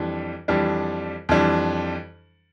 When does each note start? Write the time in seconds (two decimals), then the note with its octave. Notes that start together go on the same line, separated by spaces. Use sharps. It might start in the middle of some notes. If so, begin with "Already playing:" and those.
Already playing: F2 E3 G3 D4
0.48 F2 E3 G3 D4
1.29 F2 E3 G3 D4